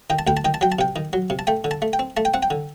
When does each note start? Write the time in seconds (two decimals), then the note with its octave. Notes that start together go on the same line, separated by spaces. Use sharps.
0.10 D#3 G5
0.19 A5
0.27 D2 G5
0.37 A5
0.45 D#3 G5
0.54 A5
0.61 F#3 G5
0.72 A5
0.79 C3 G5
0.96 D#3
1.13 F#3
1.30 C3
1.39 A5
1.47 A3 G5
1.64 D3
1.71 A5
1.82 A3
1.93 G5
1.99 C4
2.17 A3 A5
2.25 G5
2.34 C4 F#5
2.43 G5
2.51 D3